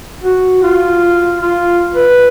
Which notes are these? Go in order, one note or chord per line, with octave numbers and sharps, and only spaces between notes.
F#4
F4
F4
B4